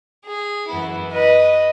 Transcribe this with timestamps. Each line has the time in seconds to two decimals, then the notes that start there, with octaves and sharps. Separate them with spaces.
0.26 G#4
0.68 F#2 E3 B3 E4
1.11 B4 D#5